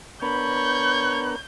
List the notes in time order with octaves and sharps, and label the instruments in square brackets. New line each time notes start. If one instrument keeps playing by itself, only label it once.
[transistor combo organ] B3 D4 A#4 [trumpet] C#5 [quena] B5 [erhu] G6